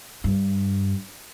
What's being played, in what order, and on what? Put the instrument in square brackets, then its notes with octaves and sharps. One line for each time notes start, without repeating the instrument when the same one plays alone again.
[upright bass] G2